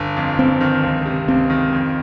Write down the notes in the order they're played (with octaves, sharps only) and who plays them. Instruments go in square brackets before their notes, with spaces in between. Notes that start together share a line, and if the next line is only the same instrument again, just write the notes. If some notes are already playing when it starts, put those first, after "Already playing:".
Already playing: [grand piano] G1
F2
[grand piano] G1 [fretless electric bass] C4
[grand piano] D#3
C#2
C3
[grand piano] C#2 [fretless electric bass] C4
[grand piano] D#3
F2